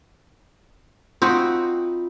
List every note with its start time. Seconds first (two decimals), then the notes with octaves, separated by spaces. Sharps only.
1.22 C4 D#4 F4 F#4